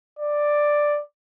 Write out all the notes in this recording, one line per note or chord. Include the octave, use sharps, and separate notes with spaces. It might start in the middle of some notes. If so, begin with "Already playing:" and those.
D5